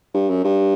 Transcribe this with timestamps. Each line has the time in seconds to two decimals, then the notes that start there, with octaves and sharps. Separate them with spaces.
0.14 G2
0.29 F#2
0.44 G2